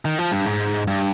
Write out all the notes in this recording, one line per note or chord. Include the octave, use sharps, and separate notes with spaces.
D#3
F3
G2
G#2
G2